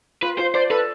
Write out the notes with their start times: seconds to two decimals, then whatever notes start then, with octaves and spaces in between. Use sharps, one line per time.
0.22 F4 B4
0.38 F4 C5
0.54 C5 D5
0.70 A4 B4